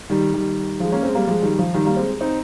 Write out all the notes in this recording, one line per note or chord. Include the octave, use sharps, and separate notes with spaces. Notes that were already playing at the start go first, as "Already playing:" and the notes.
D#3 G3
D#3 G3
F3 G#3
A#3 C#4
G#3 C4
G3 A#3
F3 G#3
D#3 G3
F3
D#3 G3
G3 A#3
G#3 C4
C4 D#4